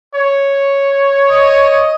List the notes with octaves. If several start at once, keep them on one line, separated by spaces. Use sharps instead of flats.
C#5
D#5